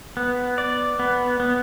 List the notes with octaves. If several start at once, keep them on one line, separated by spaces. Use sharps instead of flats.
B3
D5
B3
B3